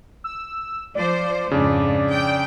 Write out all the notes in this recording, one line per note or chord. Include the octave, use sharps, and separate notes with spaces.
E6
F3 C5 D5
F2 G#2 C#3 D4 D5
G5